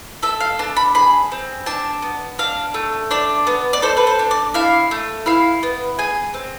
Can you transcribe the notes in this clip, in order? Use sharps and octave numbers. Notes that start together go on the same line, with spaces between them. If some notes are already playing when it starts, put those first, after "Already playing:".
A4 E5
F5
D4 A5
B5
G#4 B5
C4
D4 A5
B3
D4 F5
A3
D4 D5
B3
D5
A4 C5
B4
C5
D4
D5
E4 F5
A3
E4 F5
B3
G#4 G#5
C4